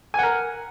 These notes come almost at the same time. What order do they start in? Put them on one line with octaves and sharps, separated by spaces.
G#5 F#5 A#4